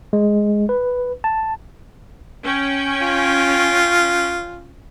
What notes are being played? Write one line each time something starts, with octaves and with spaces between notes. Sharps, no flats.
G#3
B4
A5
C#4 G5
F4